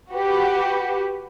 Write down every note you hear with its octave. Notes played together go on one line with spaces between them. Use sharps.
F#4 G4 B4